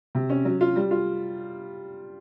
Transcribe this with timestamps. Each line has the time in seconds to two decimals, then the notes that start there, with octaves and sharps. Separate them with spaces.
0.15 C3
0.30 C#4
0.45 F#3
0.61 F4
0.76 G3
0.91 F4